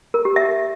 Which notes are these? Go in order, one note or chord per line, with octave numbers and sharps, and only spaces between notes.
A#4
G4
E5